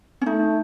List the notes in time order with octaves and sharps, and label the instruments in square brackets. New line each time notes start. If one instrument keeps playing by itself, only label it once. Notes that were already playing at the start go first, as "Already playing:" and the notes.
[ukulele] C#4
[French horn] A3 [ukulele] D#4